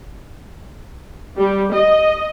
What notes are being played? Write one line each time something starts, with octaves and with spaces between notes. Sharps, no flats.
G3
D#5